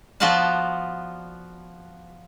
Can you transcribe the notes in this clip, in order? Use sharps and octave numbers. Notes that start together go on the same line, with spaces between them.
F3 B3 F4 F#4 D5 A5